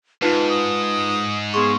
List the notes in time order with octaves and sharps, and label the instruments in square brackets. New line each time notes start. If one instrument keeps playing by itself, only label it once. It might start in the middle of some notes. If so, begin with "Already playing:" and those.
[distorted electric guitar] G#2 [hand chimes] D#4 F4 B4 [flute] A5
[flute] D#6
[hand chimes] B3 C6 C#6 [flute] G#4